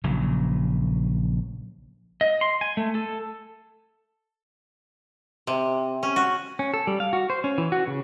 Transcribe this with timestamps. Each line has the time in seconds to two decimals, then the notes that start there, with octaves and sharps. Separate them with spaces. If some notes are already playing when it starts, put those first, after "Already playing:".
0.04 A#1 C#3 F#3
2.21 D#5
2.41 C6
2.61 G#5
2.77 A3
2.95 A4
5.47 C3
6.03 C#4
6.16 F#4
6.59 C#4
6.74 A4
6.87 G3
7.00 F5
7.13 F#4
7.30 C5
7.44 C#4
7.58 E3
7.72 F#4
7.87 C#3